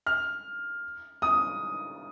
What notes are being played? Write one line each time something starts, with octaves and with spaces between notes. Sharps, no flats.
F6
D#6